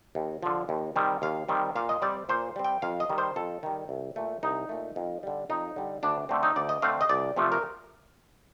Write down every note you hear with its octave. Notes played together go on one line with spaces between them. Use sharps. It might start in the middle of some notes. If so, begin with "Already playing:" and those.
D#2
D3 F3
D#2
D#3 G3 C4
D#2 F5
D#3 G3 C4
A#2 F5
D#5
G3 C4 D5
A#2 C5
G3 C4
G5
F2 F5
D#5
D#3 G3
C5
F2 A4
D#3 G3
C2
A#2 A3
C2 D#4
A#2 A3
F2
D3 G3
F2 D#4
D3 G3
D2 D4
D3 A3 C4
D#4
D2 D5
D#5
D3 A3 C4 F5
D#5
C2 D5
C3 F3 A3 C4
A#4